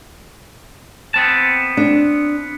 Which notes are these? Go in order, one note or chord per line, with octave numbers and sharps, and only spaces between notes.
B3 C4 A5
D4